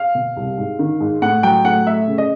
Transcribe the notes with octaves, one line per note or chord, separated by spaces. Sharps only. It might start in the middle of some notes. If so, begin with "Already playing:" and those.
Already playing: F5
B2
C2
G#2
D#3
G#2
A2 F#5
F#3 G5
A2 F#5
A3 E5
C#3
D#5